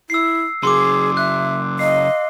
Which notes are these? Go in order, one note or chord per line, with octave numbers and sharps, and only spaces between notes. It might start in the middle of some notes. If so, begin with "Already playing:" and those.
E4 E6 C7
C#3 F#3 G#4 C6 D6
E5 F#6
D#5 F5 C7